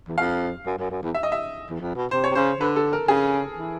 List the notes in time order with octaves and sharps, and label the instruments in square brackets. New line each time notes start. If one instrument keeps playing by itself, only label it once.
[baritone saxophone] E2
[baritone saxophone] F2 [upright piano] F5
[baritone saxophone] F#2
F#2
F#2
E2
[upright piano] E5
D#5
E5
[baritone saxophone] E2
F2
B2
[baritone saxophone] C3 [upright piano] C5
[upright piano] C#5
[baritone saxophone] C3
[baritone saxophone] C#3 [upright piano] C5
[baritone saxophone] D3 [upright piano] B4
[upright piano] A4
A#4
[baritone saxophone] C#3 [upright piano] G#4
[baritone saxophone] E3